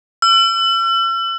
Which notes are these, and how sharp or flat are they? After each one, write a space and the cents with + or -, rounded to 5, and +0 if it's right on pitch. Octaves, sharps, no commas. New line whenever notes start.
E6 +45